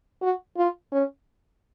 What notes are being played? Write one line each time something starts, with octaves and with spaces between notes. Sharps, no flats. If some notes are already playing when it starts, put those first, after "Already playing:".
F#4
F4
C#4